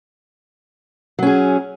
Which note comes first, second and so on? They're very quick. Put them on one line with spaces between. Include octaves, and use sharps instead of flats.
F#3 C#4 G#4